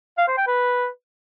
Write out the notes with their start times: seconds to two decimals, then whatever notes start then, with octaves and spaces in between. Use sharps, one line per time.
0.18 F5
0.28 C5
0.37 G5
0.47 B4